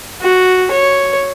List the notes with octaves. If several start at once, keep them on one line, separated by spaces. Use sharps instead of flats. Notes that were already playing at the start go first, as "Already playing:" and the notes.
F#4
C#5